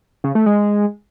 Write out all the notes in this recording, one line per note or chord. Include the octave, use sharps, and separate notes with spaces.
C#3
A3
G#3